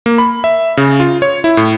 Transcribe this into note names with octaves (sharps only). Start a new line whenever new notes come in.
A#3
B5
E5
C#3
F4
C#5
E4
A2